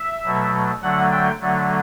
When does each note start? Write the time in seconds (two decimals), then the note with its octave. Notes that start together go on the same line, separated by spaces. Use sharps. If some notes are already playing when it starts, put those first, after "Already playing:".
Already playing: E5
0.24 B2 F#3 A3
0.82 D3 F#3 A3 F#5
1.11 G5
1.40 D3 F#3 A3